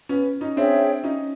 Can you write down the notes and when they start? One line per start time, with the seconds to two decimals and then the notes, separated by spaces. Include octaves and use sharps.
0.09 B3 C#4
0.41 C#4 D#4
0.57 C4 D4 G#4 C#5 E5 G5
1.04 C#4 D#4